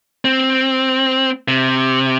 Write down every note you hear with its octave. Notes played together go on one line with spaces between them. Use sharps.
C4
C3